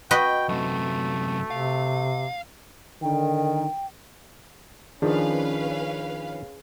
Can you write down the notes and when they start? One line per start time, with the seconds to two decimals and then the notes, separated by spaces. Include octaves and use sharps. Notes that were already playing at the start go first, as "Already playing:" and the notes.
0.11 F#4 B4 D#5 G5
0.49 F#2 C3 A3
1.51 C3 F5
3.02 D3 D#3 G5
5.02 D#3 F3 C#4 D4 G#4 B4 F5